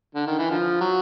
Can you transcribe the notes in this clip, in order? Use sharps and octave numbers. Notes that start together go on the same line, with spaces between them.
D3
D#3
E3
D3 F3
F#3